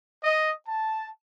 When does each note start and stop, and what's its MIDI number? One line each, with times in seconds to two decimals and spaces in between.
0.23 0.52 75
0.67 1.10 81